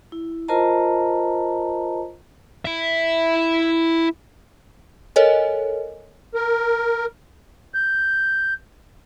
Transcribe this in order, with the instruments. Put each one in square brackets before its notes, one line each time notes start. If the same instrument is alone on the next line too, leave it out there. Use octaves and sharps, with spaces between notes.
[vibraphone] E4
F4 A#4 C5 D#5 A5 A#5
[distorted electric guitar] E4 E5
[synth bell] A4 A#4 C#5 D#5 G#5
[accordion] A#4
G6